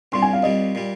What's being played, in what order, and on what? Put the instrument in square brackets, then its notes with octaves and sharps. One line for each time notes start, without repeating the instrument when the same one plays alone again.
[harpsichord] C2 A#2 G3 [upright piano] C6
[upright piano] G#5
F5
[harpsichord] C2 A#2 G3 [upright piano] D#5
[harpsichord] A#2 G3